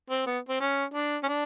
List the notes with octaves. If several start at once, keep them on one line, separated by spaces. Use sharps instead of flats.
C4
B3
C4
C#4
D4
C#4
D4